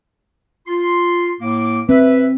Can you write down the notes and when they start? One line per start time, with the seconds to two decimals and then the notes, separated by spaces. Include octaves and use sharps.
0.68 F4 C6
1.41 A2 A#3 D6
1.89 C4 B4 E5